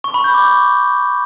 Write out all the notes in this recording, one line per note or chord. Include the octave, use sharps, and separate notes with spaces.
C#6
B5
G6
D6
C#6